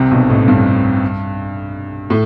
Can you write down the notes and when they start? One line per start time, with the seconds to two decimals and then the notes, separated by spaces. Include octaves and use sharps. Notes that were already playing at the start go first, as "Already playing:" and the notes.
Already playing: C2 C3
0.11 B1 B2
0.29 A1 A2
0.48 G2
2.10 A2